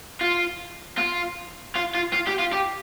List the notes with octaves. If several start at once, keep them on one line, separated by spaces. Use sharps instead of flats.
F4
F4
F4
F4
F4
G4
F4
G4